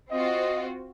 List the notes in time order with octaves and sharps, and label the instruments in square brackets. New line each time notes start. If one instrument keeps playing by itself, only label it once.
[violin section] C4 F4 F#4 [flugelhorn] D#5